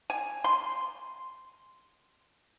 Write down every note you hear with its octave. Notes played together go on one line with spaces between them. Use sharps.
G#5
C6